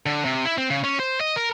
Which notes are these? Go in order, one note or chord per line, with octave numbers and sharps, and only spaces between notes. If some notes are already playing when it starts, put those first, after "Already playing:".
D3
C3
E4
C4
C#3
C#4
C5
D#5
A#4